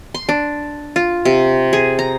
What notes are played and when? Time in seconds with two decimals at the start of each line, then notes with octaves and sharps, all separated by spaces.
0.14 C6
0.29 D4
0.96 F4
1.25 C3
1.73 G#4
1.99 A#5